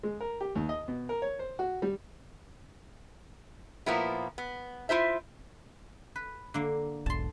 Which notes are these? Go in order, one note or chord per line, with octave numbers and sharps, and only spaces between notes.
G#3
A#4
G4
D#2
D#5
B2
A#4
C#5
C5
F#4
G3
A#2 F3 A#3 B3 E4
B3
E4 F4 C5 E5
B4
D3 A#3
E1 B1 G#2 A5 C6